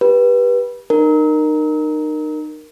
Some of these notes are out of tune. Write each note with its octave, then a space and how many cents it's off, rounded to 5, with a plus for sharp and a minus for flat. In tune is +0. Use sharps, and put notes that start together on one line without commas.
G4 +0 B4 -20
D#4 -30 A#4 +0